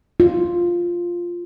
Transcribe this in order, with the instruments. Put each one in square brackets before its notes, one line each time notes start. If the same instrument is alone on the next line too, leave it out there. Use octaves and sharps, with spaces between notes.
[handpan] F4